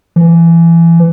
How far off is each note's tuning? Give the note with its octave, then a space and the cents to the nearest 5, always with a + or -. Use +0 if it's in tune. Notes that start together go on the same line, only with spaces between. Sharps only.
E3 +25